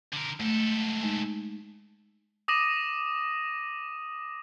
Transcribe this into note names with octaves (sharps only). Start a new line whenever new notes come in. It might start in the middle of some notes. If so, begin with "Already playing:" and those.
D3 A#4
G#2 A3 A4
G#3 D#4
D6 D#6 A#6 D#7 E7 F#7